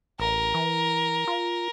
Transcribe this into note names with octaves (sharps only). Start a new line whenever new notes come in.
A1 A#4
E3
F4